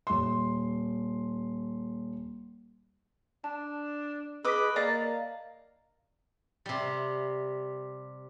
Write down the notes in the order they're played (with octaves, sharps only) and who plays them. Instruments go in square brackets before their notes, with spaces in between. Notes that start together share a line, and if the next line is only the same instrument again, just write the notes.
[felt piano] D#1 C6
[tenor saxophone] D4 [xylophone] A5
[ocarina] G#4 [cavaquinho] B4 D6 [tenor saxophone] D#5 [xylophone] E6 B6
[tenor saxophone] A#3 [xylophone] D5 D#5 [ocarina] F5 [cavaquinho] A5 A#5
[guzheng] C3 G3